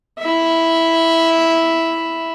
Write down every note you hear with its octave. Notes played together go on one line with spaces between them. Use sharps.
E4 E5